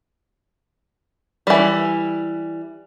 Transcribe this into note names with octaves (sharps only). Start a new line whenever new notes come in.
E3 G3